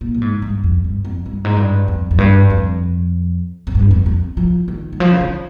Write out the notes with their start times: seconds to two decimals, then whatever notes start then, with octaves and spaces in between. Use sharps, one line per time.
0.01 A#2
0.14 A#2
0.21 G#2
0.42 G2
0.64 F2
0.84 G2
1.05 F2
1.26 G2
1.45 G#2
1.57 G2
1.88 F2
2.11 F2
2.18 G2
2.50 F2
3.67 F2
3.75 G2
3.91 F2
4.06 F2
4.37 F3
4.68 D#3
4.93 D#3
5.00 F3
5.11 C#3
5.21 D#3